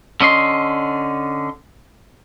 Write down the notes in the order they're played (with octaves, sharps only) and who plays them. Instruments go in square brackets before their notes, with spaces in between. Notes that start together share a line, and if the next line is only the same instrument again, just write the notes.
[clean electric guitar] D3 C#4 D#5 C6